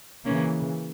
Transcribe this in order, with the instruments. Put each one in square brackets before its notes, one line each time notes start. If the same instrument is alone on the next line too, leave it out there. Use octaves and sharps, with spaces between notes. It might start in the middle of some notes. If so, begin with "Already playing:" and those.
[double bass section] C#3 E3 [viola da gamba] A#3 C#4